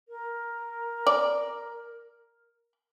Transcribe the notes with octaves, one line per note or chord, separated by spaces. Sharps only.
A#4
D5